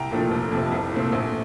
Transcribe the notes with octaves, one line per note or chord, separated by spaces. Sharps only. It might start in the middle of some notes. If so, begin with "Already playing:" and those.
Already playing: C2 G5 A#5
A#2 F3 A3 D4
F1
F2 C3 F3
C2
A#2 A3 C4
A#1